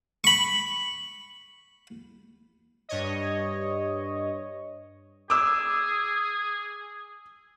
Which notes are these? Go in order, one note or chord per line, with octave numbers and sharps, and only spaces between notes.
B5 C#6
G2 C#5 D#5
G#4 D6 E6